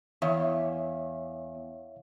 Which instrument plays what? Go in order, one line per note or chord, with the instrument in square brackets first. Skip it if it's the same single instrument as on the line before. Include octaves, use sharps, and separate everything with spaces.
[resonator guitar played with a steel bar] E2 [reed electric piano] C#5 E5 F5